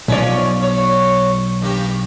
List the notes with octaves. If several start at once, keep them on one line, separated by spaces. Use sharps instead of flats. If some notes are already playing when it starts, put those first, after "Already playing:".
B1 F3 C#4 D5
F#3 C#5
G2 A#3 G4